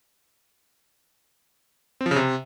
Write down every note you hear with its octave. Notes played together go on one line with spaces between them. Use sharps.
C4
F3
C#3
C3